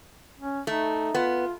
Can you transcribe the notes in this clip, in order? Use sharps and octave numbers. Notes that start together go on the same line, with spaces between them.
C#4
A3 D#4
B3 F4